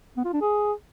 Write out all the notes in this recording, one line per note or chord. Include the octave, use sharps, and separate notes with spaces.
B3
F4
D4
G#4